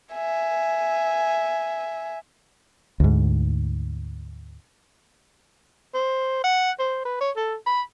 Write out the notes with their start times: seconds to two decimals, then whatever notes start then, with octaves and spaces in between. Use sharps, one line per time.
0.14 E5 G#5
3.00 D2 G#2
5.94 C5
6.44 F#5
6.79 C5
7.05 B4
7.21 C#5
7.36 A4
7.67 B5